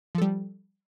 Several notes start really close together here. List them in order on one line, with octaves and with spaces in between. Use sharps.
F3 A4 G3